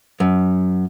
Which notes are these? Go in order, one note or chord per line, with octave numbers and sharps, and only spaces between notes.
F#2